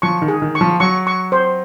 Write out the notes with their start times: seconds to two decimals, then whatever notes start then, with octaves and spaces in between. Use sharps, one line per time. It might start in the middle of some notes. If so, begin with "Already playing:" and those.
0.02 F3 C#6
0.22 D#3
0.28 G#4
0.42 D#3
0.55 C#6
0.61 F3
0.80 F#3 C#6
1.07 C#6
1.32 C5